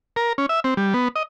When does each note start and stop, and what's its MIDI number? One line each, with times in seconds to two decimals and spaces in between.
0.16 0.33 70
0.38 0.46 61
0.49 0.60 76
0.64 0.74 60
0.77 0.94 55
0.94 1.08 59
1.16 1.23 75